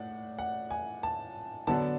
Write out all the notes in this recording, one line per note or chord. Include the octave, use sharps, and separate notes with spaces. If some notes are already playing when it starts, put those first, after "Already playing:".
Already playing: A2 D5 F#5
F#5
G#5
A5
D3 F#3 B3 D4 A5